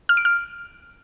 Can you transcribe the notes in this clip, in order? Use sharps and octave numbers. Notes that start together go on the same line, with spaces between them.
F6
D7
F6